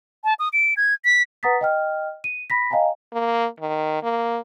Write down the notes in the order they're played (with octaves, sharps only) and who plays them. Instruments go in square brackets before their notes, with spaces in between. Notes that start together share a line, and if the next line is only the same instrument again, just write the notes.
[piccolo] A5
D#6
D7
G#6
B6
[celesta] B4 F#5 A#5 D#6 A6 B6
D#5 G5 F6
D#7
B5 A#6 B6
D#5 F5 G5 G#5 A#5
[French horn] A#3
D#3
A#3